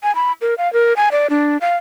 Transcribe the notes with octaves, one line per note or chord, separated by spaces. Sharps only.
G#5
B5
A#4
F5
A#4
G#5
D5
D4
F5